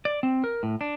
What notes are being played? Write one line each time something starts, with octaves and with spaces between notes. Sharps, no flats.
D5
C4
A#4
A2
D4